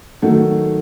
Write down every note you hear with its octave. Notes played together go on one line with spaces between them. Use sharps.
D#3 F#3 A3